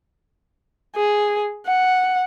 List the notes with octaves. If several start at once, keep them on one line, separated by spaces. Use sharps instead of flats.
G#4
F#5